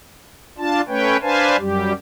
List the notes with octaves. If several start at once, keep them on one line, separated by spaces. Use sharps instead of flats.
D4 F4 A5
A3 C#4 B4 C#5 G5
D4 B4 C5 F5 G#5 A5
F#2 G3 G4